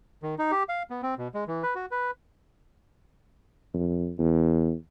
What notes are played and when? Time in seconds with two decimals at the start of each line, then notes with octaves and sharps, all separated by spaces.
0.23 D#3
0.38 D#4
0.51 G4
0.69 F5
0.90 B3
1.03 C4
1.18 B2
1.34 G#3
1.47 E3
1.63 B4
1.75 F#4
1.91 B4
3.74 F2
4.19 E2